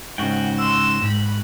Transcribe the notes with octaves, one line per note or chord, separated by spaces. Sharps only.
G#2 C#3 F#4 G5
C6 E6 E7
G#2 B5